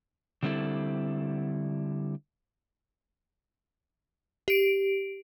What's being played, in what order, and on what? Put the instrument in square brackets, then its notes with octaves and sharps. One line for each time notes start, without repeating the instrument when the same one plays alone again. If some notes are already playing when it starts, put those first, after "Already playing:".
[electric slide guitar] D3 G3 C4 E4 A4
[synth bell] G4 D7